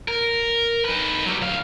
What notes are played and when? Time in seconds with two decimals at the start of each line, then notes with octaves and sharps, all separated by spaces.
0.08 A#4
0.85 D#4 B4
1.26 F#3 G3
1.41 D2 F5